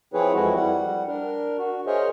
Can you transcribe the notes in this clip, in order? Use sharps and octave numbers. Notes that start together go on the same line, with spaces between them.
F3 C4 E4 G#4 B4 C#5
F2 E3 G#3 E4 F#4
G3 F#5
D4 A#4
F#4
G#4 A#4 C5 C#5 D#5 E5